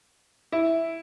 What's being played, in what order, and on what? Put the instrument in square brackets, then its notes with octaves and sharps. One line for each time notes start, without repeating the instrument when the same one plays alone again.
[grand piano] E4